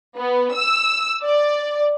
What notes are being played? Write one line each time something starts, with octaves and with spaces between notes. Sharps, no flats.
B3
E6
D5